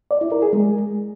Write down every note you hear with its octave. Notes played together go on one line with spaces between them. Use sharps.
D5
E4
A#4
G#4
G#3